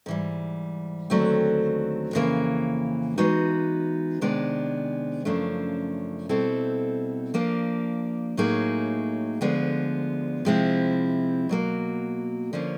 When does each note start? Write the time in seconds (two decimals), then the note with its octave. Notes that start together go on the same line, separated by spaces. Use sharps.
0.06 G#2 E3 G3
1.10 D#2 D3 F#3 A3 C4
2.13 F2 C#3 E3 G3 A#3
3.18 E3 G#3 B3 D#4 F#4
4.21 C3 D#3 G#3 B3 D4
5.25 F#2 C#3 F3 A3 D4
6.29 B2 G3 C4 E4 A4
7.34 F3 A#3 D4
8.37 A2 F#3 A#3 D#4 G#4
9.41 D2 D3 F3 G#3 B3
10.45 C3 F3 G#3 C4 E4
11.49 B2 F#3 A#3
12.53 D3 F3 A#3 C#4